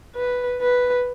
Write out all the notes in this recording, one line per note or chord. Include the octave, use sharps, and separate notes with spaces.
B4
B4